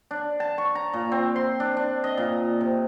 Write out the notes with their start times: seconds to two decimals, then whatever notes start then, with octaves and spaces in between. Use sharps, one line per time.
0.11 D4
0.40 A5
0.58 C#6
0.75 A#5
0.93 A#2
1.12 C4
1.36 C6
1.60 D4
1.77 D4
2.04 D#5
2.17 A#2
2.61 C3